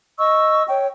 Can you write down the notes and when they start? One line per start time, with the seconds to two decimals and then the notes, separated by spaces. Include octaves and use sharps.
0.18 D#5 C#6 E6
0.69 C#5 G5